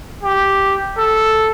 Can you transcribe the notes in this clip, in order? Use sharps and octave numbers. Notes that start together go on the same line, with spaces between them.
G4
A4